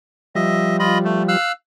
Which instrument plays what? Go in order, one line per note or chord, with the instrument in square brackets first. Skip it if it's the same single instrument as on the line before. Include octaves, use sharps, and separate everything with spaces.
[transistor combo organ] F3 G3 [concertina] D#5 E5
[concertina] F4 D#5 B5
A3
F5 E6 F#6